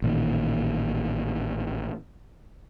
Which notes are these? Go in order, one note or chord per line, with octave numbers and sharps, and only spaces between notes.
A1 A#2 D#3